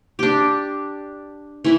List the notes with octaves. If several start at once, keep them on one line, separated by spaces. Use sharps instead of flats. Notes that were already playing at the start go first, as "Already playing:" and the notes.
D4 G4
E3 E4 E5